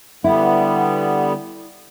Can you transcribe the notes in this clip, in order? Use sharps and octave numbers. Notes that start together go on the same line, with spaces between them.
D3 G3 B3 E4